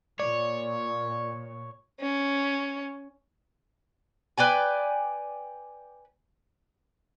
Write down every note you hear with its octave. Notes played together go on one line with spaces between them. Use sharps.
A#2 C#5 D5
C#4
B4 D5 G5 G#5